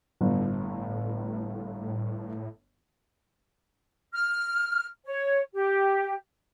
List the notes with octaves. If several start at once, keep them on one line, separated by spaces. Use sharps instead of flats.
G1 A2
F6
C#5
G4